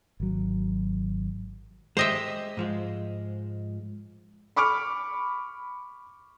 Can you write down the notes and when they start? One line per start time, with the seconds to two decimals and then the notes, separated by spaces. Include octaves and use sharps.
0.20 G#1 F#3
1.97 G#3 G4 C5 D#5 E5
2.57 G#2 F3 G#3
4.56 B5 C#6 D6 F6